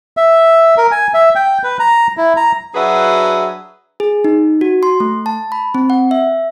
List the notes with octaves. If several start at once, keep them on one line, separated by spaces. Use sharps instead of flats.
E5
A#4
G#5
E5
G5
B4
A#5
E4
A#5
F#3 D4 F#4 G#4 B4 E5
G#4
D#4
F#4
C6
A3
A5
B5
C4
F#5
E5